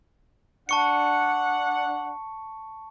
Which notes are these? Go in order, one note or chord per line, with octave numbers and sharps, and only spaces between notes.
D4 F#5 A5 C#6 C#7